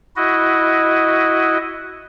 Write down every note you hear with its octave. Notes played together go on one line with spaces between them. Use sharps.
E4 F#4 D#5